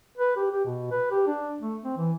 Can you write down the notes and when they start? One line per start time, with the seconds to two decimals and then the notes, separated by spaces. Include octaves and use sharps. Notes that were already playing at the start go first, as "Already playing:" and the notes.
0.18 B4
0.36 G4
0.51 G4
0.65 B2
0.91 B4
1.11 G4
1.27 D4
1.61 A3
1.84 C4
1.97 E3